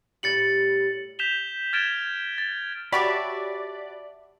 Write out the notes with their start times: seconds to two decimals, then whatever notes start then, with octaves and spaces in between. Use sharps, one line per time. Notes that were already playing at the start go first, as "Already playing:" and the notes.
0.23 A2 G3 G4 A6 C#7 F#7
1.19 G6 B6 E7 F7 G7
1.73 F6 G#6 A6 D7 E7 G7
2.38 A6
2.92 F#4 G4 C#5 D5 E5 F#5 A5 B5